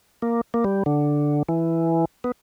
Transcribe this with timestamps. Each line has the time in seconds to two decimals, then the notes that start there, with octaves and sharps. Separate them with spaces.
0.22 A#3
0.54 A#3
0.64 G3
0.86 D3
1.49 E3
2.24 B3